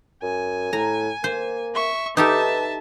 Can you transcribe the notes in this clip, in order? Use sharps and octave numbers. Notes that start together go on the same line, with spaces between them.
F#2 G#5
A2 A#5
A#3 C5
E5 C#6
D#4 G4 A4 B4 E5 A5